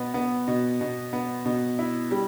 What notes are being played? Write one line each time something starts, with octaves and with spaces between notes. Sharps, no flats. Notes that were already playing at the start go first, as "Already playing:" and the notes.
Already playing: B2 B3
B3
B2
B2
B3
B2
E4
G3